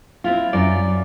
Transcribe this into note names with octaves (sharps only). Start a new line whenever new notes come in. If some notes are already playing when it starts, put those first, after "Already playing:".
C4 E4 F4
F#2 D5